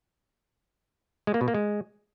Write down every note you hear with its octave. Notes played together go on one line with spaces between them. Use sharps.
G#3
A#3
B2
A#3
G#3